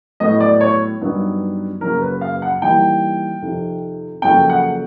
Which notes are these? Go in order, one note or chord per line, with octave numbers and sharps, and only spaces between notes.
A2 F#3 B3 D#5
D5
C#5
G2 D#3 F#3 B3 D#4
F#2 C#3 F#3 A#3 A#4
B4
F5
F#5
E3 G3 A#3 D#4 G5
F2 C3 D#3
F2 C#3 F#3 A#3 C#4 G5
F#5